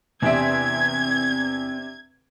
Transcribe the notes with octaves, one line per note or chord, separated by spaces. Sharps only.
E2 C3 C4 D4 C5 E5 G#6 D7